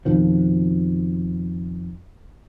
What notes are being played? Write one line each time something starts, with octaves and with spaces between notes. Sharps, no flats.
F2 B2 D#3 F3